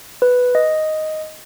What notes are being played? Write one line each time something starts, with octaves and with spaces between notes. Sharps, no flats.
B4
D#5